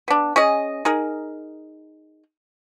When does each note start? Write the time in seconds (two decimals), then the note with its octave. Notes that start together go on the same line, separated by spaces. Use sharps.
0.08 B3 D4
0.36 C#4 G#4 D#5
0.85 D#4 G#4 A#4